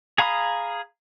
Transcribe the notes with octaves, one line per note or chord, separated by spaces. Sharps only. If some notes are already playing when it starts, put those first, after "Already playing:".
G#4 F5 A#5 B5 D#6